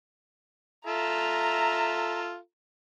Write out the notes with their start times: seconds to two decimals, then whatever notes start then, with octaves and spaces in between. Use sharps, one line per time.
0.87 F4 A4 E5 A#5